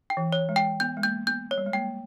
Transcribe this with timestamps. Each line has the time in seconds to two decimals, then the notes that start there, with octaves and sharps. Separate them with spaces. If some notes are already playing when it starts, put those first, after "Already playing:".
0.10 G5
0.17 E3
0.33 C#5
0.49 G#3
0.56 G5
0.80 B3 G6
0.97 G#3
1.03 A#3 G6
1.27 B3 G6
1.51 C#5
1.58 G3
1.66 G#3
1.73 A#3 G5